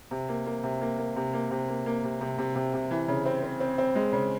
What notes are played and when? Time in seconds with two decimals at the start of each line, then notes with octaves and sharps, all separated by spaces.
0.11 C3
0.29 A#3
0.46 A#3
0.63 C3
0.81 A#3
0.98 A#3
1.16 C3
1.34 A#3
1.51 C3
1.69 A#3
1.86 A#3
2.04 C3
2.21 C3
2.38 C3
2.55 C3
2.73 C3
2.91 E3
3.08 C#3
3.26 C4
3.43 C4
3.60 C4
3.78 C4
3.95 G#3
4.13 C#3